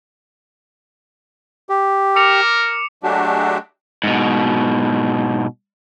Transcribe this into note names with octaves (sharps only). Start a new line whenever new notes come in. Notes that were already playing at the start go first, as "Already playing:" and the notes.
G4
A#4 D6 C#7 F7
F#3 G#3 A3 D4 F#4 G4
G#2 B2